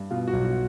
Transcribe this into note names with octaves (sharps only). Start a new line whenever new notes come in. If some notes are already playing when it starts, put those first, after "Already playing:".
Already playing: G2
B2 F4
F#4
B1
F#4